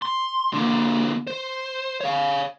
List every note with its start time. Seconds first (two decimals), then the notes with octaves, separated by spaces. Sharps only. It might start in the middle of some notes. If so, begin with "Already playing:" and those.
0.02 C6
0.54 D3 A#3
1.27 C5
2.01 C#5 F5